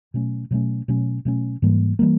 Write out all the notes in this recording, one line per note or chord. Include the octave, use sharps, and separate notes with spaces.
B2 F#3 A3 C#4
B2 F#3 A3 C#4
B2 F#3 A3 C#4
B2 F#3 A3 C#4
G#2 E3 G3 A#3
E3 G3 A#3